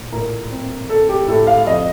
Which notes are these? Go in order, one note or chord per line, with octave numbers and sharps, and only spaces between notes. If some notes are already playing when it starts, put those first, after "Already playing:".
Already playing: A#2
A2 A#4
C4
C4 A4
G4
A2 A4
F5
F2 D#5